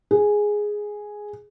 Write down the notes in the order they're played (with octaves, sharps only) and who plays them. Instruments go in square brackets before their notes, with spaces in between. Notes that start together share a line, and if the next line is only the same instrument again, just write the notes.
[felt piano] G#4